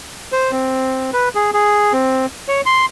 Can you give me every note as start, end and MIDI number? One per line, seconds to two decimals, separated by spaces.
0.32 0.51 72
0.51 1.11 60
1.13 1.29 71
1.35 1.51 68
1.54 1.93 68
1.93 2.26 60
2.48 2.61 73
2.66 2.86 84